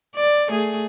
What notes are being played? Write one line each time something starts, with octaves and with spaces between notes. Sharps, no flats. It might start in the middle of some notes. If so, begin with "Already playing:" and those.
D5
A3 G#4